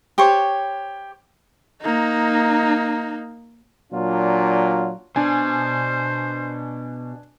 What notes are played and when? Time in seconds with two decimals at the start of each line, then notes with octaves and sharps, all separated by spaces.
0.18 G4 C5 C#5 C#6
1.82 A#3 D#4
3.93 A#2 F#3 D4 F4
5.16 B2 D4 C5 G#5